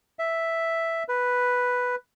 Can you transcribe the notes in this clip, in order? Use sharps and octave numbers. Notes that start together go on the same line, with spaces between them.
E5
B4